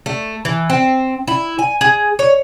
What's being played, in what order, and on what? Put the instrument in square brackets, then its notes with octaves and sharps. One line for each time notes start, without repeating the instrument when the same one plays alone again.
[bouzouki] A3
E3
C4
E4
G#5
G#4
C#5